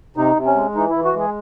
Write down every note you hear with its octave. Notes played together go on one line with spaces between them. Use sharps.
C3 D#4
C3
C#4
G#3
E3 D#4
E3 E4
F#4
G#3 G#4